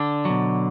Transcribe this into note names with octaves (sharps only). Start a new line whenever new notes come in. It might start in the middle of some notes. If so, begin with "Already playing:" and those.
Already playing: D3 D4
B2 F#3